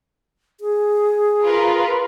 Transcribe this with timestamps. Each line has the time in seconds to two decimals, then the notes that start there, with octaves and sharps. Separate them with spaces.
0.60 G#4
1.44 F4 A#4 B4